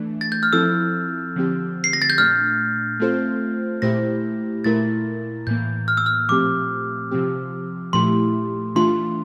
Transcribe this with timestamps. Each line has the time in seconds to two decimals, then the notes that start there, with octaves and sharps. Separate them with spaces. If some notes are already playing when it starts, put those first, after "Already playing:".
Already playing: E3 A3 D4
0.21 A6
0.32 G6
0.43 F6
0.53 F3 C4 E4 A4 E6
1.36 D3 F3 C4 G4
1.84 C7
1.93 A#6
2.02 A6
2.10 G6
2.17 A#2 A3 D4 F6
3.00 A3 C4 F4 A4 C5
3.82 A#2 A3 E4 G4 C5 A#6
4.64 A#2 A3 E4 A#4 A6
5.47 A2 E3 A#3 G6
5.88 F6
5.97 E6
6.06 F6
6.29 A#2 F3 A3 C4 G4 D6
7.11 C3 F3 C4 G4
7.93 A#2 F3 A3 E4 G4 C6
8.75 E3 A3 D4 F4 C6